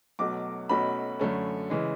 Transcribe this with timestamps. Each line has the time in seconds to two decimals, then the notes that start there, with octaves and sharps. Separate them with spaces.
0.19 B1 B2 F#3 A3 D6
0.69 B1 B2 F#3 A3 C#4 B5
1.20 F#2 D3 A3 C#4
1.70 C#3 E3 G#3